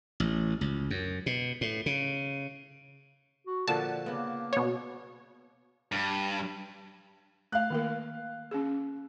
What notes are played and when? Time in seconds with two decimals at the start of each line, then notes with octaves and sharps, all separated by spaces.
0.20 A1
0.61 C#2
0.90 F#2
1.26 B2
1.61 A2
1.86 C#3
3.47 F#4
3.67 A#2 D3 F3 F#5 A5
4.06 C#3 A#3 B3
4.53 B2 C#5
5.92 G2
7.52 A3 F5 F#6
7.70 D#3 A#3 A#4
8.51 C#4 G#4